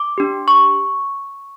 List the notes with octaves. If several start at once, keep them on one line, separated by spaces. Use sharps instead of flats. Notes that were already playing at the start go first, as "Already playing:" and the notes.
Already playing: D6
D4 G4
C#6